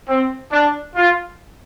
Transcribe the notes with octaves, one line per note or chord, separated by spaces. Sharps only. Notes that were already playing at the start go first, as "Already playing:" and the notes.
C4
D4
F4